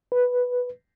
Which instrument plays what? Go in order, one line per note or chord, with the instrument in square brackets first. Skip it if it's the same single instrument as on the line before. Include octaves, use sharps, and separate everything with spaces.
[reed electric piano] B4